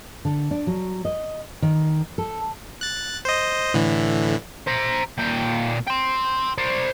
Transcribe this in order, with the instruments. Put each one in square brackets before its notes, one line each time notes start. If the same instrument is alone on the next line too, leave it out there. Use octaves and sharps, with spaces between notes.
[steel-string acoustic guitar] D3
D4
F#3
D#5
D#3
A4
[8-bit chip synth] F#6 A6
C5 D#5
A2 D3 E3
[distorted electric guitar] C5 A#5
A#2 G5
G5 C6
C5 D5